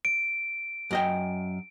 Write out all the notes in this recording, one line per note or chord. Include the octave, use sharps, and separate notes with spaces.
D7
F#2 D#5 G5